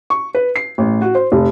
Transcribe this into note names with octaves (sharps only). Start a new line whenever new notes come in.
C#6
B4
C7
A1
F#4
C5
F1